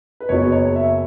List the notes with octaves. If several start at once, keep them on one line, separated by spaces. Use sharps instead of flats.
B4
F#1 F#2 F#3 B3 C#5
C#5
E5